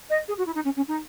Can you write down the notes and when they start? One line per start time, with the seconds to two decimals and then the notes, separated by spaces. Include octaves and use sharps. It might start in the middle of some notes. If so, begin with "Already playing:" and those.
0.10 D#5
0.28 G#4
0.38 F#4
0.46 E4
0.55 D#4
0.65 C#4
0.76 C#4
0.88 D#4